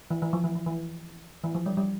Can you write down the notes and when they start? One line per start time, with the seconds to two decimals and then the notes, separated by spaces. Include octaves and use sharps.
0.11 E3
0.22 E3
0.33 F3
0.44 E3
0.55 E3
0.66 E3
1.44 E3
1.55 F3
1.66 G3
1.77 G3